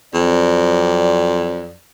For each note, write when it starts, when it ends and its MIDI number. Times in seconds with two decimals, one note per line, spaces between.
0.14 1.75 41
0.14 1.75 54
0.14 1.75 60
0.14 1.75 74